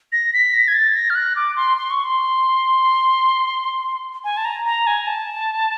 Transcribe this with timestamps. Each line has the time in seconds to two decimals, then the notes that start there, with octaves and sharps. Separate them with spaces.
0.12 A#6
0.33 B6
0.54 A#6
0.68 G#6
0.74 A6
0.96 A#6
1.10 F6
1.15 F#6
1.36 D6
1.56 C6
1.77 C6
1.90 C#6
2.05 C6
4.24 G#5
4.37 A5
4.45 A#5
4.65 A#5
4.87 G#5
5.07 A5